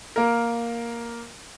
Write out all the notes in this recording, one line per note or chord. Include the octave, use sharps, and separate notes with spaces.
A#3 A#4